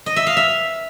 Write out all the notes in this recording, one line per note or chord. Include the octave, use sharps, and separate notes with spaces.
D#5
E5
F5
E5